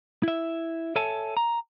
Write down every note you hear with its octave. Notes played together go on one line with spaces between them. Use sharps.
E4 E5
A4 C#5 E5 G#5 A5
A#5